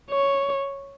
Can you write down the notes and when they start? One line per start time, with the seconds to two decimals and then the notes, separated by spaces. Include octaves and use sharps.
0.10 C#5